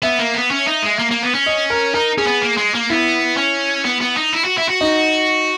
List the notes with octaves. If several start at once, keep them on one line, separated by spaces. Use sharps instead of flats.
B3 E5
A#3
B3
C#4
D#4
G#3
A#3
A#3
B3
C#4
D#5
A#4
D#4 A#4
C#4 G#4
B3
A#3
G#3
A#3
B3 E4
C#4
B3
B3
D#4
E4
F#4
E4
F#4
D#4